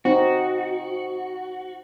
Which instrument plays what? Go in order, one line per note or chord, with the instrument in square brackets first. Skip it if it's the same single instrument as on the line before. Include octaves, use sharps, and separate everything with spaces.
[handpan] C4 D#4 [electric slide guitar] F#4